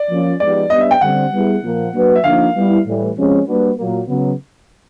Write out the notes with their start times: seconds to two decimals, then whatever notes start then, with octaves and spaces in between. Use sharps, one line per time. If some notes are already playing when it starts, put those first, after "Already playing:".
Already playing: D5
0.10 F3 A#3 C#4 F4
0.40 F3 G#3 B3 D#4 G4 D5
0.70 G3 B3 D4 D#5
0.81 E5
0.91 G5
1.01 D3 G3 C4 F#5
1.32 G3 B3 E4 G#4
1.63 A#2 F3 A#3
1.93 F#3 A#3 D4 F#4 B4
2.16 E5
2.24 D3 F3 A#3 D#4 F5
2.55 G3 B3 E4
2.86 A2 E3 G3
3.16 C3 F3 G#3 C#4
3.47 G3 A#3 D4 F#4 B4
3.77 A#2 F#3 A#3
4.08 C#3 F#3 B3